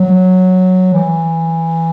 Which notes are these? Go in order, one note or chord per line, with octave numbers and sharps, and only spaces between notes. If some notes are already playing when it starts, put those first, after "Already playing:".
Already playing: F#3
E3